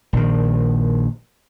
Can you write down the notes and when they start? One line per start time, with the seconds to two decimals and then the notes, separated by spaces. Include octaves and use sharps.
0.13 A#1 D#3